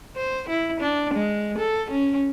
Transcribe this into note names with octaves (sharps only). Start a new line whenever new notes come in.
C5
E4
D4
G#3
A4
C#4